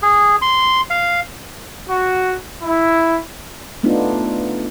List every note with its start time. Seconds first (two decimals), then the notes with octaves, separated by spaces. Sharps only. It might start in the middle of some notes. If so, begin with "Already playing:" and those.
0.02 G#4
0.42 C6
0.90 F5
1.88 F#4
2.62 E4
3.83 A3 B3 D4 D#4 F4